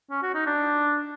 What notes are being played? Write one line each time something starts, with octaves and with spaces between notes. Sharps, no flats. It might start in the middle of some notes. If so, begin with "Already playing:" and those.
C#4
F#4
D#4
D4